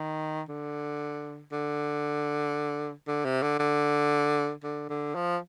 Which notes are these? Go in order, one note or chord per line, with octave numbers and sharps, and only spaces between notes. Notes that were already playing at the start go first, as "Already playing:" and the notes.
Already playing: D#3
D3
D3
D3
C3
D3
D3
D3
D3
F3